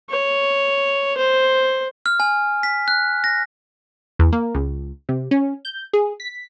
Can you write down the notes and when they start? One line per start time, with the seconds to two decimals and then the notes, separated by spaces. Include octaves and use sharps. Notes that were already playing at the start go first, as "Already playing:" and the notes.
0.10 C#5
1.18 C5
2.06 F6
2.20 G#5
2.63 B6
2.88 F#6
3.24 A#6
4.19 E2
4.32 A#3
4.55 C#2
5.09 C3
5.31 C#4
5.65 G6
5.93 G#4
6.20 B6